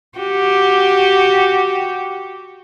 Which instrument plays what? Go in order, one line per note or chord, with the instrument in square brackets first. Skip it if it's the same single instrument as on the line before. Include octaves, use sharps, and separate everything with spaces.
[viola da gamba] F#4 G4